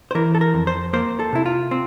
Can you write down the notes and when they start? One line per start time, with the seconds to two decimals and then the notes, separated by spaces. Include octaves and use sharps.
0.11 C5
0.15 E3 A#4
0.35 A4
0.41 A#4
0.54 F2
0.67 C5
0.93 A#3 C5
1.19 A4
1.33 C3 E4
1.46 F4
1.71 C4